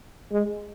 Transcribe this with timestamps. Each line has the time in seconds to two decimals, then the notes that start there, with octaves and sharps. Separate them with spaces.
0.32 G#3